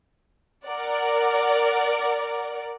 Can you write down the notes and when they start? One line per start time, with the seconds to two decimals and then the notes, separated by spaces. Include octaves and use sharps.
0.67 A#4 D5 F#5